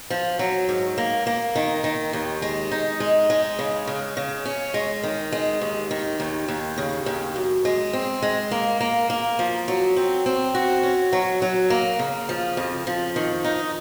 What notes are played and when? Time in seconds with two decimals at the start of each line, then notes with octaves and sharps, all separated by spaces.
0.10 F3
0.39 F#3
0.69 G#2
0.98 A#3
1.27 A#3
1.56 D#3
1.84 D#3
2.13 D#2
2.42 G#3
2.71 D#4
3.00 G#3
3.30 G#3
3.59 C#3
3.87 C#3
4.17 C#3
4.45 C#4
4.74 G#3
5.03 D#3
5.32 G#3
5.61 D#2
5.91 D#3
6.20 D#2
6.48 D#2
6.78 C#3
7.06 D#2
7.36 F#2
7.65 G#3
7.93 C4
8.22 G#3
8.51 A#3
8.81 A#3
9.10 A#3
9.39 F3
9.68 F#3
9.96 C4
10.26 C4
10.55 F#4
10.83 C#4
11.13 F#3
11.42 F#3
11.70 A#3
11.99 C#3
12.29 F3
12.57 F2
12.87 F3
13.16 D#3
13.44 D#4